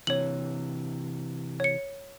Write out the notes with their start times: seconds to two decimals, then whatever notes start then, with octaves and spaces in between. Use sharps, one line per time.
0.07 C3 E3 C#5 F#7
1.60 C#5 C#7